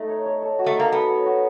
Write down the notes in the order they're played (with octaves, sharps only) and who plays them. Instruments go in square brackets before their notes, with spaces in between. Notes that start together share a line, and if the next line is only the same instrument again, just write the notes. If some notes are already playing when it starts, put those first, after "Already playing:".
Already playing: [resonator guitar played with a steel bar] A3 [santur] D#4 A4
[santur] C#5
C#5
A4
F#4
[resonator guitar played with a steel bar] A3
[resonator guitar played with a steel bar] A#3 [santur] D#4
[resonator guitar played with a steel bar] B3 [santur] A4
[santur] C#5
F#4